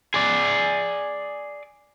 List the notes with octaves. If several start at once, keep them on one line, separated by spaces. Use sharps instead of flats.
G#4 D5